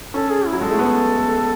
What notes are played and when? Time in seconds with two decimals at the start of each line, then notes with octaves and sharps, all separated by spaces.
0.14 C#4 A4
0.31 G#4
0.47 E4
0.53 F#3
0.61 G#3 A4
0.71 A3
0.79 B3